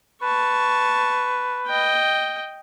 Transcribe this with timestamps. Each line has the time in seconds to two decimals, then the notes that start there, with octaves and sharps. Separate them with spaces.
0.22 B4 A5 C#6
1.67 D#5 G5